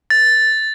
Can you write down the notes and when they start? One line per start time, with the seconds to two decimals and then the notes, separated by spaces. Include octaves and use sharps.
0.10 A6